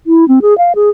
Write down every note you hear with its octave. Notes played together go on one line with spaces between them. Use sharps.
E4
C4
G#4
F5
G#4